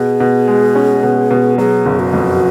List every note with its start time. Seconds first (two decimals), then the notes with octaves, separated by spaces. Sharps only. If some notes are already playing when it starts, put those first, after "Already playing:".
Already playing: B2 G#4
0.20 B2
0.48 G#3
0.75 C#4
1.03 B2
1.31 B2
1.58 F#3 G#4
1.86 F#1
1.99 F#4
2.14 F2